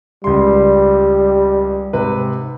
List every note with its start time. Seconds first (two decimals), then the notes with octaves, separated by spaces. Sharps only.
0.24 C#2 G3 C6
1.93 G#2 C3 B4